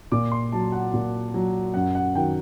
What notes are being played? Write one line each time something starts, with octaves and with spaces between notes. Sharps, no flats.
A#2 D6
C6
F#3 A5
F#5
A#2
F#3
F#2 F#5
F#5
D#3 F#3 G5